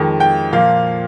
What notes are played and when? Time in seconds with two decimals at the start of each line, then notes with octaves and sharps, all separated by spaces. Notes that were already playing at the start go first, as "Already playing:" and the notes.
Already playing: F2 D#3 G#3
0.20 G5
0.52 A#2 F3 A#3 F5